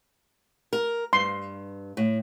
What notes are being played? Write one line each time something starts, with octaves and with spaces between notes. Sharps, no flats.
A#4
G2 C6
A2